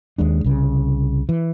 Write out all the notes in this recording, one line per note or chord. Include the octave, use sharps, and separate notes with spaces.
D#2 G#3 D4
C2 C#3
E3